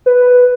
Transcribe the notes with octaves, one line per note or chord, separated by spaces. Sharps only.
B4